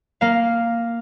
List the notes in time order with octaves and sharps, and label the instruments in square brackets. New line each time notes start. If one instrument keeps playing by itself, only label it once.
[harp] A#3 F5